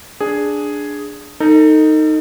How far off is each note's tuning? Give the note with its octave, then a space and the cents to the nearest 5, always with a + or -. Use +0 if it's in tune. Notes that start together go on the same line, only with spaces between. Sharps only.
D4 +0 G#4 +0
D#4 +0 A4 +35